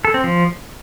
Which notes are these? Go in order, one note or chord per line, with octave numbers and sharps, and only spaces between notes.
A4
C4
F3